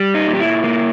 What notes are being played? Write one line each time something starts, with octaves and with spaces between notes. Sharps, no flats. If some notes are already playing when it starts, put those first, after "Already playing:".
Already playing: G3
D#4
A#2
G4
E4
A#3